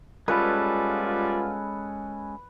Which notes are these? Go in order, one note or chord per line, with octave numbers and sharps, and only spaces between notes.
G3 G#3 B3 C#4 F4 A4 B4